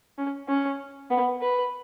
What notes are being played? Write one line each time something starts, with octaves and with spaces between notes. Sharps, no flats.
C#4
C#4
B3
B4